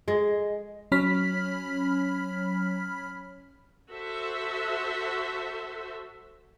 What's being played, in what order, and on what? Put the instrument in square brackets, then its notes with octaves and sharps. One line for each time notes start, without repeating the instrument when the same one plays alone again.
[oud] G#3
[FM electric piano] F#3 C#4 C#5 B5 F6 B6
[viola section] F#4 A4 C5 E5